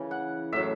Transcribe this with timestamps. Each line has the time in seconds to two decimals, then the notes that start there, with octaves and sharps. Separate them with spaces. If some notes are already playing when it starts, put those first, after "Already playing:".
Already playing: C#3 E3
0.11 F#5
0.53 A2 F#3 E5